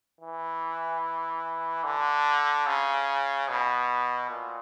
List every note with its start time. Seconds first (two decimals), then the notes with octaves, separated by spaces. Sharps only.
0.21 E3
1.84 D3
2.67 C#3
3.49 B2
4.31 A#2